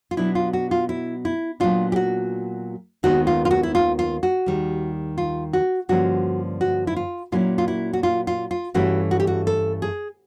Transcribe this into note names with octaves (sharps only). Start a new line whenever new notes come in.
F4
B2 F#3 B3 D4 E4
F4
F#4
F4
E4
E4
A#2 F#3 B3 D4 F4
G4
F#4
D#2 D#3 G#3 B3 D#4 F#4
F4
F4
F#4
E4
F4
F4
F#4
D#2 D#3 G3
F4
F#4
G2 D3 F3 A#3 C#4 F#4
F#4
E4
F4
A#2 F#3 A#3 C#4 E4 F4
F4
E4
F#4
F4
F4
F4
G2 E3 A3 C#4 E4 F#4
F#4
G4
F#4
A4
G#4